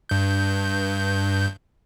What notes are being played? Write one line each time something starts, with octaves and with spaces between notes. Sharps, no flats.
G2 G6